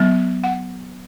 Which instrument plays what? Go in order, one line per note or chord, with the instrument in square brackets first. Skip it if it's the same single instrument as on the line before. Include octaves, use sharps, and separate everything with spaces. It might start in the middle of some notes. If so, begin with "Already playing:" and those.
Already playing: [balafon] F#3 B3
F#5